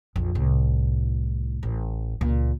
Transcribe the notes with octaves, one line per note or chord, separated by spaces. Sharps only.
A#1 F2
C2 A2
A1
C#2 A#2